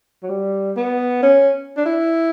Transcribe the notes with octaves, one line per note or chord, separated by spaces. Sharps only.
F#3
G3
B3
C#4
D4
E4